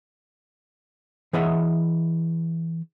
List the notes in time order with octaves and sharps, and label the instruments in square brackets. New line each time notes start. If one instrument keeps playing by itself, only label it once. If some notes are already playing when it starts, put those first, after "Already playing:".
[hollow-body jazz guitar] E3 G#4 C#5 D#5 E5 F#5